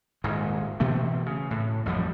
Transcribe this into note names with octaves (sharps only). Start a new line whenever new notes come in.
D#1 G#2 D#3 G#3
B2 E3 A3 C4
C#3
A2
A1 F2 F3 G3